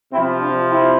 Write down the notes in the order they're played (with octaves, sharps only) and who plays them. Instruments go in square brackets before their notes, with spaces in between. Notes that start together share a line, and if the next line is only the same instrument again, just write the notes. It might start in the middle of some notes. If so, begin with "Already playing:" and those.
[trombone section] C3 F3 C4 E4
D4 F4
C4 E4